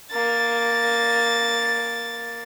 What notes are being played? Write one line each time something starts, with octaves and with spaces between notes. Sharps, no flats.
A#3 A6